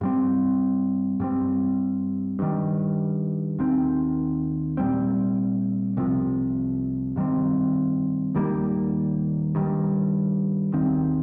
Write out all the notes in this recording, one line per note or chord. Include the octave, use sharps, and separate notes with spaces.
G2 G3 C4
G2 G3 C4
G2 D#3 G3
D#2 D#3 C4
A#2 G3 C4
C2 C3 F3
G2 D#3 G3 C4
D#2 D#3 G3 A#3
G2 D#3 G3
D#2 D#3 C4